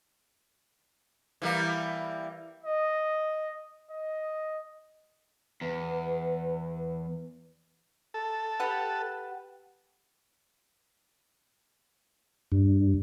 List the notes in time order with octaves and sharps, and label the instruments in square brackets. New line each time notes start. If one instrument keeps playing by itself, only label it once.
[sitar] E3 G3 A#3
[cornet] D#5
D#5
[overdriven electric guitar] E2 [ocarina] B4
[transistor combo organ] A4
[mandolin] G4 B4 F#5
[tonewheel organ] G2